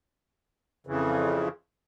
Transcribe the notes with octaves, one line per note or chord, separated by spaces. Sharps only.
F2 C#3 E3